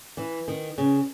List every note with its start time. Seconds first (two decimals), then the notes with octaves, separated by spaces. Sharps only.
0.17 E3
0.48 D#3
0.78 C#3